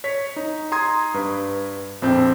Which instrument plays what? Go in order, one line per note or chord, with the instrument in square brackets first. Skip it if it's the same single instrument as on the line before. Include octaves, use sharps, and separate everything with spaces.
[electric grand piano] C#5 B6
D#4
A#5 C6 D#6 G#6
G2 B4
A#1 F2 C4 G6